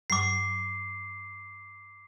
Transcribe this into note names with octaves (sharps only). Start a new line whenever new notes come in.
G2 F#3 D6 C7